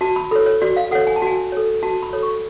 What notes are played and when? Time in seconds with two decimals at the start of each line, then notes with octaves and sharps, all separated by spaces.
0.01 F#4 A5
0.16 B5
0.31 A4 C#5 B5
0.46 C#5
0.62 F#4 D5
0.76 F5
0.91 A4 C#5 F#5
1.07 G#5
1.16 A5
1.22 F#4 G#5
1.52 A4 C#5
1.83 F#4 A5
2.03 B5
2.13 A4 C#5
2.23 C#6